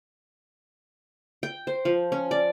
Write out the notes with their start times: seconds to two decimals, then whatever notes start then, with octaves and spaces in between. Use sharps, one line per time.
1.43 G5
1.67 C5
1.85 F3
2.12 C#4
2.31 D5